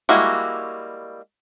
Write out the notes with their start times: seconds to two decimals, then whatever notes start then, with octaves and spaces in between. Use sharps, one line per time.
0.09 G3 G#3 A#3 E4 F#4